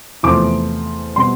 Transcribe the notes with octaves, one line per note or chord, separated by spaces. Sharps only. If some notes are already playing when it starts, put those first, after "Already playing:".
E2 C3 F3 A3 C4 D6
B2 G3 C4 C6